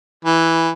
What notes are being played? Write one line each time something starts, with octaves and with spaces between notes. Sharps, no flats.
E3